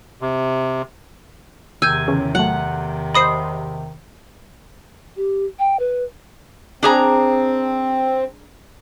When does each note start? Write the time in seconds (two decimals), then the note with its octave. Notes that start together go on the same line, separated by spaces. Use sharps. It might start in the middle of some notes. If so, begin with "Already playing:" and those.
0.21 C3
1.82 E2 C3 D#3 G#5 E6 G6
2.08 C#3 E3 C#4
2.35 F#3 A3 F#5
3.14 C5 D#5 B5 D#6 C7
5.16 G4
5.59 G5
5.79 B4
6.83 C4 D4 G#4 A#5